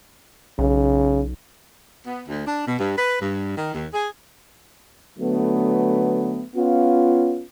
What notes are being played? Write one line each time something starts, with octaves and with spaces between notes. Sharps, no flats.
B1 C#3
B3
D2
D4
B2
G2
B4
G2
D#3
D#2
G#4
D3 F#3 A3 B3
B3 C#4 F4